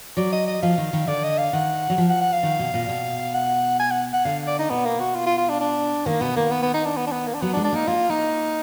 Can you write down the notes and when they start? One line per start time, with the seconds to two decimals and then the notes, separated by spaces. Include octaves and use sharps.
0.17 F#3 D5
0.32 D#5
0.47 D#5
0.62 F3 F5
0.78 D#3
0.93 D#3
1.07 D3 D5
1.23 D#5
1.38 F5
1.53 D#3 F#5
1.90 F#3
1.98 F3
2.10 F#5
2.21 F#5
2.32 F5
2.43 D#3
2.59 B2
2.74 A#2
2.89 B2
3.34 F#5
3.79 G#5
3.91 F#5
4.13 F#5
4.25 D3 F5
4.47 D5
4.59 D#4
4.70 B2 B3
4.85 A#3
5.00 F#4
5.15 F4
5.26 F4
5.38 F4
5.49 D4
5.60 D4
6.06 D#3 A#3
6.21 B2 B3
6.36 D#3 A#3
6.51 B3
6.62 B3
6.74 D#4
6.85 D4
6.97 B3
7.07 D4
7.12 B3
7.27 A#3
7.34 D4
7.41 F#3 B3
7.53 D4
7.57 G#3
7.64 D4
7.73 A#3 D#4
7.87 A#3 F4
8.10 A#3 D#4